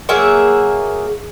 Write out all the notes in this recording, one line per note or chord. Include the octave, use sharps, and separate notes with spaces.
F#3 A#3 G#4 E5